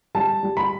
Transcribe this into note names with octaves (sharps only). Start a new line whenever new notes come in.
G3 A5
G3
B5